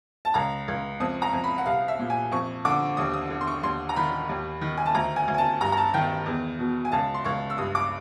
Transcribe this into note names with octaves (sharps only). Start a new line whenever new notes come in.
A5
C#2 A#5
C#2
F2 D#6
A#5
F2
B5
F#5
C2 F5
E5
A#2
G#5
F2 C#6
D3 D6
D#2 D#6
D#6
D3
C6
C#6
D#2 C6
A#5
D#3 B5
D#2
D#3
G#5
A5
D2 A#5
G#5
D2
G#5
A5
G2 A#5
A#5
A5
D#3 G5
E2
B2
G#5
C#2 A5
C6
C#2 C#6
E6
G2 D#6
D6